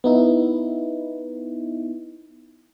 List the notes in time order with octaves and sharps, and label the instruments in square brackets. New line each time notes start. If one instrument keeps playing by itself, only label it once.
[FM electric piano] B3 D#4 E4